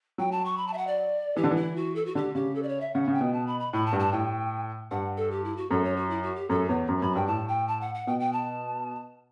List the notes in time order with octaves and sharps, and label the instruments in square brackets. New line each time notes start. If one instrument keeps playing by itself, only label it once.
[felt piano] F#3 [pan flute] G5
[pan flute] A5
C#6
B5
A5
E5
F#5
D5
[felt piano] E3 [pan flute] G4
[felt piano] D3
[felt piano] E3 [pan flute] E4
[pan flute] F#4
A4
F#4
[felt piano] D3 [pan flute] G4
[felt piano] C#3 [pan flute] G4
[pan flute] A4
D5
C#5
E5
[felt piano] C#3 [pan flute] F#5
[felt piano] C#3
[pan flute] G5
[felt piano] B2
[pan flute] A5
B5
B5
[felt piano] A2 [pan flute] B5
[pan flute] A5
[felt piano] G2
[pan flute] A5
[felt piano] A2 [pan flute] G5
[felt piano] G2 [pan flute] F#5
[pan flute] A4
G4
E4
F#4
[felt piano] F#2 [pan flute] A4
[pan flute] C#5
F#4
E4
F#4
G4
[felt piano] F#2 [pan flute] A4
[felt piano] E2 [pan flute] C#5
[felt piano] F#2
[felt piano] F#2 [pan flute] B5
[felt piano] G2 [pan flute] G5
[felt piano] A2 [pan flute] A5
[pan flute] G5
A5
F#5
F#5
[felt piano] B2 [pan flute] G5
[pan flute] G5
A5